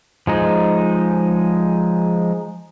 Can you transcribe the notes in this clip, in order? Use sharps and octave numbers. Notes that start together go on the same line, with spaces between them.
F3 G#3 D#4